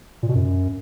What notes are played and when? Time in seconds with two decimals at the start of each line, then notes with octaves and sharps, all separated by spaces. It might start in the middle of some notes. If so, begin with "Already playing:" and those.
0.23 A#2
0.29 B2
0.35 F#2